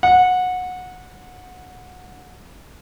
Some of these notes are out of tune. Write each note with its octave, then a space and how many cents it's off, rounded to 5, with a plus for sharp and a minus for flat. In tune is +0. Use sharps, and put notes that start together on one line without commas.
F#5 -20